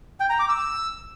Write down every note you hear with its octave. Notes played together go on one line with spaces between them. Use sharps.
G5
A#5
D6
E6